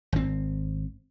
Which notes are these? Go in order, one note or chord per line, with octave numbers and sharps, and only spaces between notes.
G#1 C4